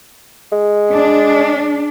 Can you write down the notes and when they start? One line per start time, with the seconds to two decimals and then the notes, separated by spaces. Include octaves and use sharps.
0.52 G#3
0.92 D4